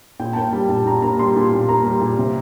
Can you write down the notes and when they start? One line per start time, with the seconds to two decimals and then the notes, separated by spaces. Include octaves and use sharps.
0.20 A#2 G5
0.33 A5
0.36 A#3 G5
0.53 G3 A5
0.69 A#2 A5
0.86 A#2 A#5
1.02 A#3 A#5
1.19 G3 C6
1.36 A#2
1.52 A#2
1.68 A#3 A#5
1.86 G3
2.01 A#2
2.18 C3